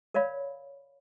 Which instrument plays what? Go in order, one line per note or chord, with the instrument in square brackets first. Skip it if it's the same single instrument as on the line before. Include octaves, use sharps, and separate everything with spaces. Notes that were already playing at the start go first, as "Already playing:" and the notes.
[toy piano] A#4 C#5 D5 F5 B5